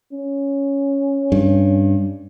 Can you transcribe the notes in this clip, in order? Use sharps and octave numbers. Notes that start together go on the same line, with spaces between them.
C#4
G2